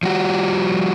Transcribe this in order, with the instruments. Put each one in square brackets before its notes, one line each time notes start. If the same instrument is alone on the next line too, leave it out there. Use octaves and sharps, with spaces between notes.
[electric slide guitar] F3 G3 F#4